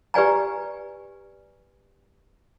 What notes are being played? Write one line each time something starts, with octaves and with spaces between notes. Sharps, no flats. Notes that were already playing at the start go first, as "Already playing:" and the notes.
G4 B4 D5 G#5 A#5